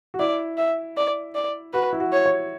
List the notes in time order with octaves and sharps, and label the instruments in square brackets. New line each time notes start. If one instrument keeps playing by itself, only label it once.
[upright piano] F#4
[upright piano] E4 [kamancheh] D5
[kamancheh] E5
D5
D5
[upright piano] F#4 [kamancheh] B4
[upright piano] E4
F#4
[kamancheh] C#5
[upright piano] C#5